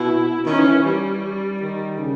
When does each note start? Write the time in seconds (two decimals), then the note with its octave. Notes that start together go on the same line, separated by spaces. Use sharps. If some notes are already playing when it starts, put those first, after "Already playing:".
Already playing: B2 E4
0.46 D#3 C#4
0.59 E3
0.85 G3
1.61 D#3
1.98 C#3